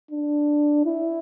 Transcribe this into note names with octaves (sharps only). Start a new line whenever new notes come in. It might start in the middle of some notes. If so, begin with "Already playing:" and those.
D4
E4